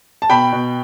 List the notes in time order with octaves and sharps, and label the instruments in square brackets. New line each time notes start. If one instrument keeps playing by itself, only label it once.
[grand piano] A5
B2 G5 B5
B2